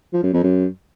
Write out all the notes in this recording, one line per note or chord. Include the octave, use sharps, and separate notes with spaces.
F3
F#2
F2
F#2